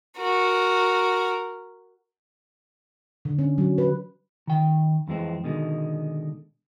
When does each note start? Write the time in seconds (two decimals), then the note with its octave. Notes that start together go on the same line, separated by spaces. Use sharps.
0.18 F#4 A#4
3.25 D3
3.39 C#4
3.58 F#3
3.78 B4
4.47 D#3 G5
5.08 F2 E3 G#3 C4
5.44 B2 D3 D#3 G#3